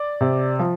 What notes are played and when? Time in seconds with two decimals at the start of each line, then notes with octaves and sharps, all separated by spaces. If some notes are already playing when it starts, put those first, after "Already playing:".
Already playing: D5
0.21 C3
0.59 F3